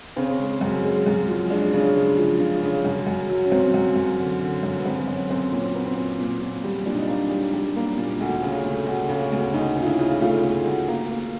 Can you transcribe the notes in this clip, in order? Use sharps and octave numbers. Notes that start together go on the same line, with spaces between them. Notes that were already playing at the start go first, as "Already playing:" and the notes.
C#3 C4
G#3
F#2
G#3
F#2
F3
G#3 D4
C#3
G#3
F3
C#3
C#3
F#2
F#2
F#3
C#4
F#2 C4
F#2
F#2
D3
D3
F#2
B3
F#2 C4
F#2 C#4
F#2 C4
A#2 C#4
C4
A#3 B3
C4
A#2
A#2
A#2
G3
A#2 D4
D#4
D4
A#3
G3
G3
A#3
A#2
D2
C#3
A3
D2
C#3
D2
D2 D#4
C#3
F4
E4
C#3
A3 F4
A3
D2
A#3
A#3